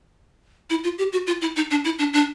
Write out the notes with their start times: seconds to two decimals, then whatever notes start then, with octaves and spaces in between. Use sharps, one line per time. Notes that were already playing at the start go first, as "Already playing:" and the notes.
0.70 E4
0.84 F4
0.98 G4
1.13 F#4
1.27 F4
1.41 E4
1.56 D#4
1.71 D4
1.85 E4
1.99 D4
2.13 D4